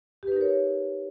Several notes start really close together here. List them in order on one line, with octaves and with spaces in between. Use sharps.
G4 B4 D#4 A#4 C#5